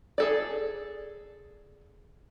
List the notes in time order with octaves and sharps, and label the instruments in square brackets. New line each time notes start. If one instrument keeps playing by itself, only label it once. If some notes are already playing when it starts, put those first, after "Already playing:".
[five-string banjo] G#4 A4 D5